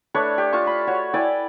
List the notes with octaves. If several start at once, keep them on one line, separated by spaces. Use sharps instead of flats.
A3 D4 B4 C#5
G4
F4 A5 C#6
B5
F#4 C#5
E4 D5 G5 G#5